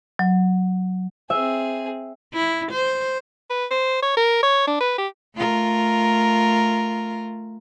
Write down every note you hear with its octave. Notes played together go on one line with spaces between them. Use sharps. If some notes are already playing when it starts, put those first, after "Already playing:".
F#3
C4 G#4 E5
E4
C5
B4
C5
C#5
A#4
C#5
D4
B4
G4
A3 F4 A#4